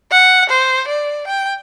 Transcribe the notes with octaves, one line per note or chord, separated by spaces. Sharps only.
F#5
C5
D5
G5